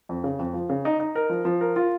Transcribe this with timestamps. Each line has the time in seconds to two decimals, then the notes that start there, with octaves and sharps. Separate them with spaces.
0.09 F2
0.24 C#3
0.39 F2
0.54 F3
0.70 C#3
0.85 D#4
1.00 D#4
1.15 A#4
1.29 F3
1.45 F3
1.61 A#4
1.76 F4